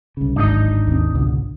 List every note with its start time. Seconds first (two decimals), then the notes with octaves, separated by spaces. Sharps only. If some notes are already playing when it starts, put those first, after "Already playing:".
0.17 C2 C#3
0.36 D1 G#1 D4 D#4 D#5
0.87 D#2 C4
1.14 C#2 B2 D3